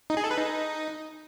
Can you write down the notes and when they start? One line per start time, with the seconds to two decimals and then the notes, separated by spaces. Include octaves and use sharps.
0.10 D#4
0.17 G#4
0.24 A4
0.31 B4
0.38 D#4